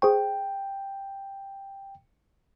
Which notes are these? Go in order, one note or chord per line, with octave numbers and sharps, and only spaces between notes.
G#4 C5 G5 C#6